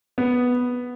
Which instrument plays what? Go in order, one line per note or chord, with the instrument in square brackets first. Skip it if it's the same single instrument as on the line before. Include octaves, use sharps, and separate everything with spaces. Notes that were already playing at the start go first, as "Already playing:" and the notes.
[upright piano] B3